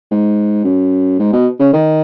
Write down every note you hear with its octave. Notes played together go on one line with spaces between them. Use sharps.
G#2
F#2
G#2
B2
C#3
D#3